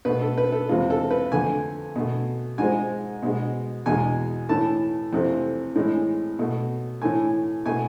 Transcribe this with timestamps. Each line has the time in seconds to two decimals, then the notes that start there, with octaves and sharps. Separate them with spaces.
0.05 B2 A3 B4
0.21 A4
0.38 B4
0.52 A4
0.69 E2 C3 G#3 F4
0.90 A4
1.11 B4
1.32 F2 D3 A3 G#5
1.96 B2 A3
2.58 G#2 F3 G#3 G#5
3.23 B2 G#3
3.86 E2 B2 G#3 G#5
4.49 A2 E3 A3 A5
5.13 F2 C3 E3 A3
5.75 A2 E3 G#3
6.39 B2 A3
7.01 A2 E3 A3 G#5
7.66 B2 A3 G#5